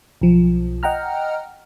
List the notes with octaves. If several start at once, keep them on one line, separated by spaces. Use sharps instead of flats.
B1 F3
D#5 F#5 G5 A#5 F6